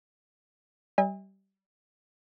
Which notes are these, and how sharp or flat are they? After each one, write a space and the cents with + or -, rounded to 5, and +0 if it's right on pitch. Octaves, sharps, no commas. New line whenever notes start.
G3 -20 E5 -45 G#5 -40